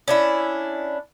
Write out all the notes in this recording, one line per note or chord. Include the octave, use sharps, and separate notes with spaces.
C#4 D4 E4